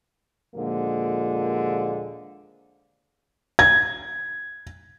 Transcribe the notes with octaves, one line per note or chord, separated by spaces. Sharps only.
D#2 A#2 D3 F3 G#3 A#3
G#6